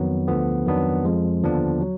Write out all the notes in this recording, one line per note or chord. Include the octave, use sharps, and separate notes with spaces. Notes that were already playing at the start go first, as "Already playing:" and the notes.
Already playing: F2 D#3 F#3 B3
D2 D3 F3 B3
F2 D#3 F#3 B3 D4
F2 F3 G#3
D#2 D3 F3 B3 D4
F#3